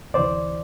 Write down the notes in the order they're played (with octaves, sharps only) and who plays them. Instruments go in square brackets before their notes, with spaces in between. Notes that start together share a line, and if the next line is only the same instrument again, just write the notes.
[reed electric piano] D2 C3 E3 C5 D5